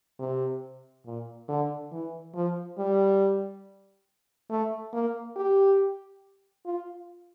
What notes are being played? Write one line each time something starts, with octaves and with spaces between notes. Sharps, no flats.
C3
A#2
D3
E3
F3
G3
A3
A#3
G4
F4